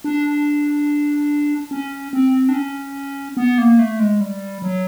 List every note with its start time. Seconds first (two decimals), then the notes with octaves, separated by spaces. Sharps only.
0.04 D4
1.71 C#4
2.13 C4
2.49 D4
2.54 C#4
3.37 B3
3.58 A#3
3.79 A3
4.00 G#3
4.21 G3
4.62 F#3